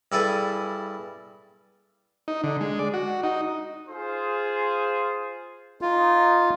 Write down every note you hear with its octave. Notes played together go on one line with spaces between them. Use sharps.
G2 E4 G#4 A4 G#5
D#4
D3
G#3
D5
F#4
D#4
F4 G#4 C5
D#4 F4